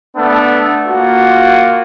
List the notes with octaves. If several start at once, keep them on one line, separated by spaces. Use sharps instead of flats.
A3 B3 D4
A#3 F4 F#4